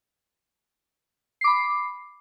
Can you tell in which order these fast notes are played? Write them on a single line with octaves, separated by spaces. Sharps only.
C7 D6 B5